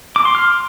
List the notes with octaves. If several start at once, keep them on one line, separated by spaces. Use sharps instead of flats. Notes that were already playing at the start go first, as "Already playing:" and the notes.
D6
C6
F6